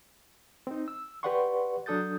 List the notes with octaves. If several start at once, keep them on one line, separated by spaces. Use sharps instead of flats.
C4 D#4
E6
G4 B4 D5 F#5 C6 C#6
F#3 D4 A4 D#6 G6 A6